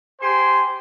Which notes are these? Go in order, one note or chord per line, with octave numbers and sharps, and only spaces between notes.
G4 C5 G#5 C6